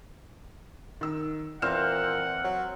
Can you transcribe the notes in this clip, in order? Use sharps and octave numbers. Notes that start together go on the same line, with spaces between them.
D#3 E6
A#2 E3 C4 F#5 F6 E7
F#3